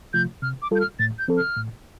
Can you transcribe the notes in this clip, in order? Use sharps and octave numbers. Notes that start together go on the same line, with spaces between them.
C3 F3 A3 F4 G6
C3 F6
D6
G3 F4 A4 G6
F6
A2 A6
G6
F3 C4 A4
F6
A2